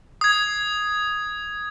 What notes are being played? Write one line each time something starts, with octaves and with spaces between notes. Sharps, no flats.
D#6 G#6